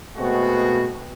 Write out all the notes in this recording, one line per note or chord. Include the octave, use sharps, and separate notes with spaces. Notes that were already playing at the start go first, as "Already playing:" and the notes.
B2 G#3 A3 C4 F#4